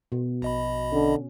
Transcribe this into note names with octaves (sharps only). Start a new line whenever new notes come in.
B2
A#1 D#5 B5
D3 C#4